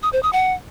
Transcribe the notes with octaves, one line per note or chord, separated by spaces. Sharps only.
D#6
C5
D#6
F#5